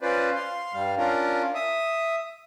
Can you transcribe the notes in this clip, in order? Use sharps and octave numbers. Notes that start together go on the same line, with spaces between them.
C#4 F4 B4 C5 D5
F5 C6
G2 G3 F5
C#4 D4 F4 A#4
E5 D#6